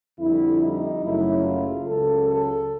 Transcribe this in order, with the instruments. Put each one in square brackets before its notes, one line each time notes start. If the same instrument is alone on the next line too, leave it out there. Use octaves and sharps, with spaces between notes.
[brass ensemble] F2 D3 G3 E4
D#4
F#1 F#2 C#3 F#3 A3 E4
F4
C#2 C#3 F#3 A4
A4